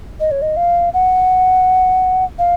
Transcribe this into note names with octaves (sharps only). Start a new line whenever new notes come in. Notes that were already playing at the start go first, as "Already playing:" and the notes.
D#5
C#5
D#5
F5
F#5
F5